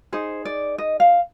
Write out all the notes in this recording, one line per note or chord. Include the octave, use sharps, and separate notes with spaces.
D#4 G#4 C5
D5
D#5
F5